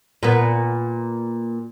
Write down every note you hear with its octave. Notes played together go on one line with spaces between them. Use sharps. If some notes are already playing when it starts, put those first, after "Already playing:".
A#2 B3